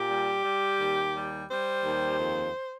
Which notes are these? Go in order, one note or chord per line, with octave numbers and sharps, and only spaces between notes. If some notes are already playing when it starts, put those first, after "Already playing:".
Already playing: A#2 G4
G3
G3
D#2
G3
G3 C5
D#2
F2